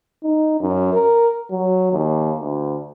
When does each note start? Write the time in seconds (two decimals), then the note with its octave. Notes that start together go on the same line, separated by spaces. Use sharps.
0.23 D#4
0.60 F#2
0.93 A#4
1.51 F#3
1.92 D#2
2.38 D2